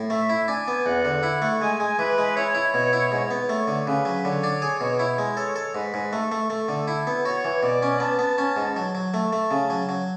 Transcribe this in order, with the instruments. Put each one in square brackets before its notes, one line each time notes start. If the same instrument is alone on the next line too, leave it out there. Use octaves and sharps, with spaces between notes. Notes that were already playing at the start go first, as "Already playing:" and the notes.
Already playing: [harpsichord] A2
[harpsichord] A3 [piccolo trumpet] E5
[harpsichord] E4
[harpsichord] D4 [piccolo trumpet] G#5
[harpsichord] B3
[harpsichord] E2 [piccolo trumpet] F#5
[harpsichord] D3
E4
A3
[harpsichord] G#3 [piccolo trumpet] G#5
[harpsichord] G#3
[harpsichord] E3 [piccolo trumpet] B4
[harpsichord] G#3
[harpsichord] E4 [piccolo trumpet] C#5
[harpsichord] E4
B2
E4
G#2
B3
[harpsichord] A3 [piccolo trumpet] C#5
[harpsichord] D3
[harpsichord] C#3 [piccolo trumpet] B4
[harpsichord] F#3
[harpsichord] D3 [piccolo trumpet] C#5
[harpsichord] D4
G#4
B2
E4
G#3
[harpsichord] A4 [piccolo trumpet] C#5
[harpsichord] A4
[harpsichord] G#2 [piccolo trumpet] B4
[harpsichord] G#2
[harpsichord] A3 [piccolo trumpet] A4
[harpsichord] A3
[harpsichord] A3 [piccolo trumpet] A4
[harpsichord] D3
E4
B3
[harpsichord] F#4 [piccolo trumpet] C#5
[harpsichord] E3
[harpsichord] B2 [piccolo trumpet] D5
[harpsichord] C#4
[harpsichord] B3 [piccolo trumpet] A5
[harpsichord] B3
C#4
G#2
F#3
F#3
[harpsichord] A3 [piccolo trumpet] A5
[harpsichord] A3
C#3
F#3
F#3